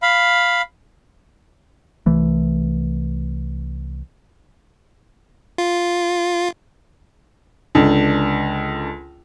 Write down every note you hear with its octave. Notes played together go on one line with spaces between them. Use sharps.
F5 B5
C2 E3 A3
F4
C#2 D3 D4